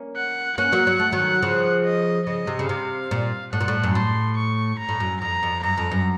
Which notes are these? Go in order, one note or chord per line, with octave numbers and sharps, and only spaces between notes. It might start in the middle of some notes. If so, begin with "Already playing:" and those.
Already playing: A#3 C#4
F#5
A#3 C#4 F#5
F#3 A#3
F#3
A3
D#3 F#3
C#3 F3
D#5
C#3 D#5
C3
C#3
C3 F5
A#2
A2 F#5
A#2
A2
F#2
A2 C6
C#6
A#5
A2
F#2
F2 A#5
F2
F#2 A#5
F2
F#2